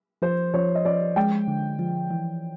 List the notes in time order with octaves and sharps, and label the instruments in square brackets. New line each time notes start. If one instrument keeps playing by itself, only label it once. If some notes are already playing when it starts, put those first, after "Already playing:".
[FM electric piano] F3 [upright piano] C5
[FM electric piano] F3 [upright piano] C#5
[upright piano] D#5
[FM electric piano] F3 [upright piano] D5
[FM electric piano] G#3 [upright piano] G5
[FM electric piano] D3
F3
E3